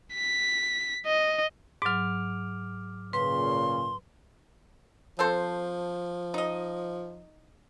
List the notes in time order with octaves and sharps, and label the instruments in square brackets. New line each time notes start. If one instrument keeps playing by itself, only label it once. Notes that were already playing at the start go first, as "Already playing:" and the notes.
[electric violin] B6
D#5
[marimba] G#2 F#3 [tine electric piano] D6 F6
[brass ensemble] A#2 C#3 [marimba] B4 [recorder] C6
[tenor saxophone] F3 [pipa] C4 A4 C5
[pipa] D#4 D#5